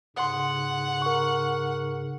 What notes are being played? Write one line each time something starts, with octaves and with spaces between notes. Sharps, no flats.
G#2 C#3 F#5 C6 D#6
A#4 C#6